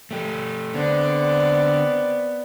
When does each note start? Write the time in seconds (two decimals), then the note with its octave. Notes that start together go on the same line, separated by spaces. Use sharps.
0.11 A3 G4
0.74 D3 B3 C4 D5